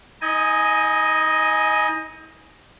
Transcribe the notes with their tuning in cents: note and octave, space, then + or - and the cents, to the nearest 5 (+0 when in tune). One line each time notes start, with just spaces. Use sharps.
D#4 +45 D#5 +0 G#5 +5